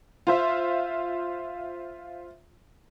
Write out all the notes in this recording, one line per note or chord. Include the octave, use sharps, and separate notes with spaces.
F4 C5 E5